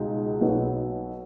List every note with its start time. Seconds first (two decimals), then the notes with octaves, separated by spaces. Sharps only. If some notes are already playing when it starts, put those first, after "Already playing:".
Already playing: C#2 B2 G#3 D#4
0.41 B1 B2 F#3 B3